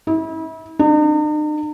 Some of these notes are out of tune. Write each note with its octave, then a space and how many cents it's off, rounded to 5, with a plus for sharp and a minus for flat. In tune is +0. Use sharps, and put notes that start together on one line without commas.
E4 -35
D#4 -45